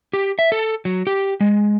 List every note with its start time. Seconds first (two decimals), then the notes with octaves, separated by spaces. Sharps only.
0.13 G4
0.39 E5
0.52 A4
0.85 F#3
1.07 G4
1.41 G#3